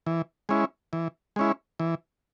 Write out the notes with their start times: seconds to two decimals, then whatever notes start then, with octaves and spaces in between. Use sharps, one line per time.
0.06 E3
0.49 G#3 C#4 E4
0.93 E3
1.36 G#3 C#4 E4
1.80 E3